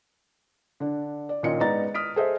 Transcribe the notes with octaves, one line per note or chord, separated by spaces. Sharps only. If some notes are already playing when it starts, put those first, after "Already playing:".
D3 D4
D5
A#2 D#3 C#4 F4 D#5 C#7
G#2 B3 D#4 D5 A#5 A6
D#6 F6 B6 D7
G#4 A4 C5 D#5 E5